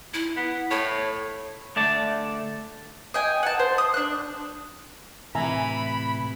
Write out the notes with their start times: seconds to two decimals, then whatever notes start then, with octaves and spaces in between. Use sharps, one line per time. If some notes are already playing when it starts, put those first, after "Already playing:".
0.14 E4
0.37 B3
0.71 A2 C#5
1.76 D3 A3 D5 A5
3.14 D#5 G5 G#5
3.43 F#5 A5
3.59 C5
3.78 D#6
3.94 D4 F#6
5.35 A2 C3 E3 E5 G#5 A#5 B5